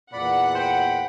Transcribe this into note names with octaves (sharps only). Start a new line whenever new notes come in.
E2 A#2 D5 F#5 B5
C5 G5 B5